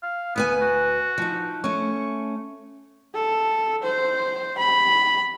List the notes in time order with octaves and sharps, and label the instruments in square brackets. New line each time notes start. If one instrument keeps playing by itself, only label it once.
[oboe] F5
[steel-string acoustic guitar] D2 B4 G#5 [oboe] B3
[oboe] F#4
[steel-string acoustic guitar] F3 D#4
[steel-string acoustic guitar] A3 C#4 [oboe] C#6
[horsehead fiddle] A4
C5
B5